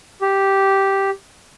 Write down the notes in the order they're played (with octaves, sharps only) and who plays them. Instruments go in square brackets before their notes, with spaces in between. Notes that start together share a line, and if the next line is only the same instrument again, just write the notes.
[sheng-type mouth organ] G4